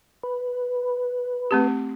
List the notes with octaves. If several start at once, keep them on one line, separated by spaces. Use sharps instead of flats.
B4
A3 C4 G4